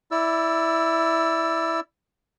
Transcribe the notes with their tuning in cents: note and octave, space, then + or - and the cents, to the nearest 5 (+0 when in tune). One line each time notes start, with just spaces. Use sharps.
E4 -5 D5 +0 E6 +15